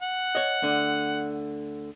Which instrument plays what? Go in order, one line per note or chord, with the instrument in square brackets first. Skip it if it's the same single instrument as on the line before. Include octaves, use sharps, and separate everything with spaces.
[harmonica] F#5
[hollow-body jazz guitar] C#5 D#5
D2 D3